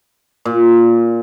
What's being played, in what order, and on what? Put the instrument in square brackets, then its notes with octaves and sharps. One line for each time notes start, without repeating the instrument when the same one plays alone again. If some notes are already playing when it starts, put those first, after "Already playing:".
[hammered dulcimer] A#2